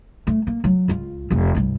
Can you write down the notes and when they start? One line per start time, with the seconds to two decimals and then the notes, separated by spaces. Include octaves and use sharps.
0.27 A3
0.47 A#3
0.64 F#3
0.88 C#2 F4
1.30 F1 C4
1.55 C2 G2